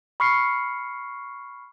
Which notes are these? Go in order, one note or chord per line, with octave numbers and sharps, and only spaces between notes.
B5 C#6 F6 C7 C#7